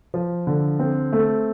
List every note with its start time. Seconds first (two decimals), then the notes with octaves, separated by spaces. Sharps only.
0.14 F3
0.47 D3
0.79 C4
1.13 A3